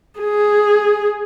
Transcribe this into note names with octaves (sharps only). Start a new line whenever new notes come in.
G#4